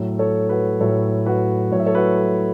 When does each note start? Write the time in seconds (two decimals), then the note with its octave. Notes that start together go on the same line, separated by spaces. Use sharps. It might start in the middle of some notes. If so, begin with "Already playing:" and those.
Already playing: A2 F#3
0.19 A4 C#5
0.49 F#4 B4
0.80 A2 F#3 A4 C#5
1.26 F#4 B4
1.71 A2 C#5
1.75 F#3 E5
1.86 A4 C#5
1.95 F#4 B4
2.17 A4